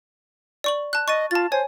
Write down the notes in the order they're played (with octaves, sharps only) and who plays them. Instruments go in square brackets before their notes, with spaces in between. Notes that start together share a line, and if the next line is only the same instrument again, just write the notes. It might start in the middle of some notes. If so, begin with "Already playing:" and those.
[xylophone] D5 C#6 F#7
A5 F#6
[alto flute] D#5 [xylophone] C#6 A6 D#7
[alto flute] F4 [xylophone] A5 A6
[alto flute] C5 [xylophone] C#5 G#5